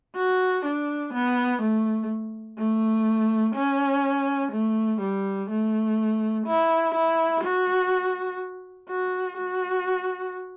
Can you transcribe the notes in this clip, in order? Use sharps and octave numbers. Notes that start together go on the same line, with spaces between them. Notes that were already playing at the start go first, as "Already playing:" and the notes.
F#4
D4
B3
A3
A3
C#4
A3
G3
A3
E4
E4
F#4
F#4
F#4